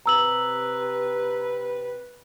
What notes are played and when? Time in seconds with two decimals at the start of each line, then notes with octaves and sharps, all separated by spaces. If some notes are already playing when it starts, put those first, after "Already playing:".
0.06 C3 B4 A#5 E6 F#7